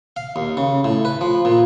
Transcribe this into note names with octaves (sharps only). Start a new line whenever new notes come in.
F5
D#2
C#3
A2
B4
F3
A#2